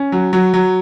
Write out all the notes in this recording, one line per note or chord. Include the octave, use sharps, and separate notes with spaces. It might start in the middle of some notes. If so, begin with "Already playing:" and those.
Already playing: C#4
F#3
F#3
F#3